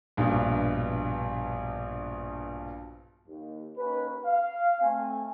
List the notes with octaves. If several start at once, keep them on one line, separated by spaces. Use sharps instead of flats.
A#1 G2 B2
D#2
D#2 C#4 D#4 B4
F5
A3 C4 G#5